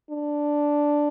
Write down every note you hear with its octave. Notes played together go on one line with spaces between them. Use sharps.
D4